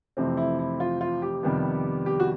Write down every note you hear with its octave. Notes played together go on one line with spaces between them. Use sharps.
F2 C3 E3 A3 C4
E4
E4
F4
F4
G4
F2 C3 D#3 G3 B3
G4
F#4